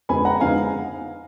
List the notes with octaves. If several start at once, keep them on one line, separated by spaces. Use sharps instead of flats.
F2 D3 G#3 B3 G#5 B5
F#5 A#5
F2 D3 G#3 B3 D#4 F5 G#5